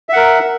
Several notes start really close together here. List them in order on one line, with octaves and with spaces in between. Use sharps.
E5 F#5 A#4